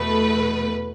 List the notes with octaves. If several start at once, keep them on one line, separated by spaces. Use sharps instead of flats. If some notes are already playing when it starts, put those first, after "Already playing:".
Already playing: E2 B2 A3 B4